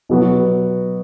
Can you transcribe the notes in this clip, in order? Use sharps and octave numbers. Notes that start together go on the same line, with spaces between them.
B2 F#3 B3 F#4